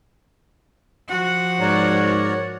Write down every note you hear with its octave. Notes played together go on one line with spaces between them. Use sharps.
F3 F#4 F#5
G#2 A#4 C#5 D5